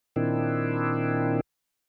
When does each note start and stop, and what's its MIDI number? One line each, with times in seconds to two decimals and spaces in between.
0.16 1.40 46
0.16 1.40 51
0.16 1.40 60
0.16 1.40 62
0.16 1.40 64